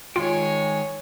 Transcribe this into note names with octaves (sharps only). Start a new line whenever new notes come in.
D#3 G#3 F4 C#5 G5 G#5